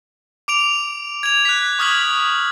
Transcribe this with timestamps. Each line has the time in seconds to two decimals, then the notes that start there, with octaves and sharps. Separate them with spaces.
0.48 D6 D7 F7
1.23 G#6 F7
1.45 F#6 B6
1.79 C#6 D#6 F6 G#6 B6 F#7